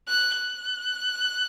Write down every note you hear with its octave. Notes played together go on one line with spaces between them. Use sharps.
F#6
F#6